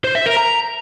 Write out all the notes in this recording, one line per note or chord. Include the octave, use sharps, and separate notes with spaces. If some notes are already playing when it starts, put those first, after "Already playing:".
C5
E5
A#4
A#5